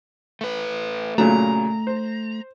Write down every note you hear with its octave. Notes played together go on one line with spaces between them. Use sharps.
A3 B4
A#2 C#3 F#3 A3 A#5
C5